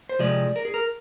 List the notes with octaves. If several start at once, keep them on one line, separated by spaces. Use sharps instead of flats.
C5
C3 F3 G#3 D5
A#4
G#4
A#4